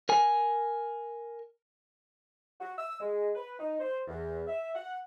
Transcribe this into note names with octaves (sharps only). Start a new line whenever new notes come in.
A#4 G#5
F#4
E6
G#3
B4
D#4
C5
E2
E5
F#5